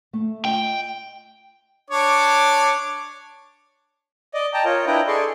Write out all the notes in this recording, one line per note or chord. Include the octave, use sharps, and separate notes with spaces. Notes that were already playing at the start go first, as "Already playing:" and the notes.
A3
F4 D#5 G5
D4 C#5 D6
D5 D#5
G5 A5 A#5
F4 A#4 C#5 D#5
D4 E4 B4 D#5 G5 A#5
G#4 A4 D5 C6 C#6